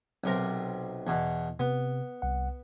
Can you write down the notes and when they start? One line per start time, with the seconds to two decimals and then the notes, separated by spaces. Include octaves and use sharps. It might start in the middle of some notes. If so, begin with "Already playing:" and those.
0.24 B1 C3 A#4
1.07 E2 B2
1.60 C3 B3
2.22 C2 F#5